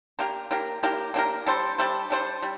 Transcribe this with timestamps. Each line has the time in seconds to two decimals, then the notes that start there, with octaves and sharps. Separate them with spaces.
0.19 A#3 D4 G4 A#4
0.51 A#3 D4 G4 A#4
0.83 A#3 D4 G4 A#4
1.14 A#3 D4 G4 A#4
1.46 G3 D4 A4 C5
1.78 G3 D4 A4 C5
2.10 G3 D4 A4 C5
2.42 G3